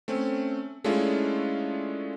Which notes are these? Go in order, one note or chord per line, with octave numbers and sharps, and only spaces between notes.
A3 C4 C#4
G#3 A3 C#4 D4 E4 F4